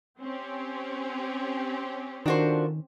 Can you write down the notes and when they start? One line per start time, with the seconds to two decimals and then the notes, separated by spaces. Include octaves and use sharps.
0.20 C4 C#4 G4
2.26 D#3 D4 F4 F#4 A4 A#4 C5